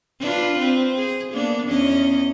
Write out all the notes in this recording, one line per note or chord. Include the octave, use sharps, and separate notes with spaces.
D4 F4 B4
C4
G#4
A#3 B3 D4
E2 C#4 D#5